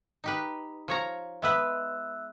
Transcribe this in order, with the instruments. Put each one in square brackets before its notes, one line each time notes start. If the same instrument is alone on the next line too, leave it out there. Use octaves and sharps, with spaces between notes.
[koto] D#4 G4 B4
F3 C#5 A#5
[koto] G#3 B3 B4 [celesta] E5 E6 F#6